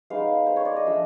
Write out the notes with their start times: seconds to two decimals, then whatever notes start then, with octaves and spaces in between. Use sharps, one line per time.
0.10 G#3 B3 D#4 F5
0.46 C5
0.56 C#5
0.65 D5
0.76 D#5
0.86 F3 A3 D4 E5